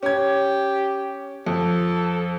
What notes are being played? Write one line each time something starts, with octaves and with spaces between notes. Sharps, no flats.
C#4 G4 G#6
F2 A4